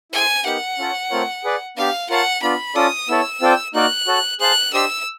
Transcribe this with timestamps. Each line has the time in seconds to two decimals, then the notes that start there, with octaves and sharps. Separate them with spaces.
0.12 E4 G#4 C5 G#5
0.45 B3 D#4 G4 A#4 F#5
0.78 C#4 F4 A4 C#5
1.11 A3 C4 F4 A#4 C#5
1.44 G#4 B4 D5
1.77 B3 D4 G4 F5
2.09 F4 A#4 C#5 F5 F#5 A5
2.42 B3 D4 F4 B5
2.75 C#4 F4 A4 D5 D#6
3.08 B3 E4 A4 C#5 E6
3.41 C4 F4 A4 D5 G5
3.74 A#3 D#4 F#4 A#4 D5 F#6
4.07 F#4 A4 C#5
4.40 G#4 C5 F5 A5 F#6
4.73 D4 G4 C5 D#5 E6